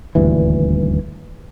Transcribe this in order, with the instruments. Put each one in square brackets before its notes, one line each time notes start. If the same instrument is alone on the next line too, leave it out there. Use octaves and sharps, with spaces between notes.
[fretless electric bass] D#1 D2 G2 E3